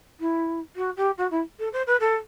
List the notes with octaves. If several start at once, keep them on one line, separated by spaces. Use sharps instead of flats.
E4
F#4
G4
F#4
E4
A4
C5
B4
A4